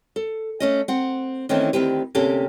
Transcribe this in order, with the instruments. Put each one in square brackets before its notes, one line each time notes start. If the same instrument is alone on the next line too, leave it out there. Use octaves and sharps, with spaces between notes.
[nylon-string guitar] A4
A3 C#4 D#5
C4 F#5
D#3 E3 A3 C4 C#4 D#4
D2 D#3 C4 G4 B4
D2 C3 A#3 C#4 G4 A4